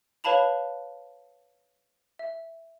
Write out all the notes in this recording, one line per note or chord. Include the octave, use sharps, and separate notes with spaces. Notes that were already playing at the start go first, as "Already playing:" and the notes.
B4 C#5 F5 A5 B5 F7
E5